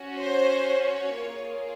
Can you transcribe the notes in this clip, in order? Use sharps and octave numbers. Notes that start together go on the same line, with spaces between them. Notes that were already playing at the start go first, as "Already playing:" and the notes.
Already playing: C#4 F#4
C5
C#5
A#3 F4 G#4